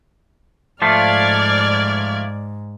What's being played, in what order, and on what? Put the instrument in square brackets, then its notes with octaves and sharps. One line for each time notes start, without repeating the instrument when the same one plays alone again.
[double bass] G#2 [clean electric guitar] F3 A3 F4 [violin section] D5 F6 G#6